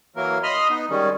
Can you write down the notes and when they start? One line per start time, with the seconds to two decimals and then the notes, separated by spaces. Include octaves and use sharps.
0.16 E3 F#3 A#3 A#4
0.43 D#5 B5 C6 D#6 F6
0.70 B3 D#4
0.91 D#3 G3 G#3 C#4